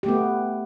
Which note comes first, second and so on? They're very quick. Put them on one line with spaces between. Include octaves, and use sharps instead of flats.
G4 A3 B3